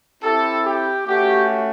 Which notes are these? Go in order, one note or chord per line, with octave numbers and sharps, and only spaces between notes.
C4 E4 G4 A4
G4
A3 C#4 F#4 G4